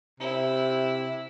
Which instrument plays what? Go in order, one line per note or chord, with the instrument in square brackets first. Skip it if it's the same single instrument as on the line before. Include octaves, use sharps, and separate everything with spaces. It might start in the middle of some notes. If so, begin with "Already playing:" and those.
[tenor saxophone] C3 [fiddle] E4